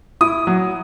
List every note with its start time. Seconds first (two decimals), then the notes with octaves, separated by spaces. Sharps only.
0.21 E4 D#6
0.47 F#3